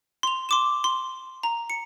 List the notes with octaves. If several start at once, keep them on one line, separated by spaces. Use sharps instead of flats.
C6 F7
C6 D6 E7
C6
A#5
C#7